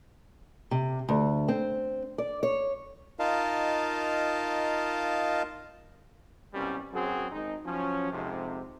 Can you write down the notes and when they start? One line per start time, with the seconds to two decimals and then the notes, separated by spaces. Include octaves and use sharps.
0.71 C3
1.09 D2
1.48 C4
2.18 D5
2.43 C#5
3.19 D#4 F4 A#4 D#5 F5 A5
6.52 C2 F#2 B2 G3 C#4
6.92 F#2 F#3 C4 F#4 G#4
7.31 G#1 D#4
7.64 F3 F#3 C#4
8.11 F2 G#2 C3